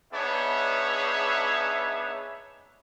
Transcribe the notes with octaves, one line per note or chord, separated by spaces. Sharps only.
B3 D4 D#4 G#4 C#5 E5